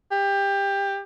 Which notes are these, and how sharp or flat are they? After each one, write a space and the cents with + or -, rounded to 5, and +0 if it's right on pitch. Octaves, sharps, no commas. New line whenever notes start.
G4 +20